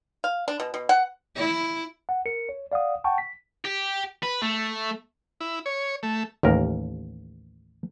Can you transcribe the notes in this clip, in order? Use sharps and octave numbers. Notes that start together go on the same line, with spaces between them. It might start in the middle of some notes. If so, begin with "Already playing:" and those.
F5
D4
B2
B2
F#5
E4
F#5
A#4 C#7
C#5
D5 F5 F#5 D#6
F#5 G5 A5 C#6
B6
G4
B4
A3
E4
C#5
A3
A1 D#2 A#4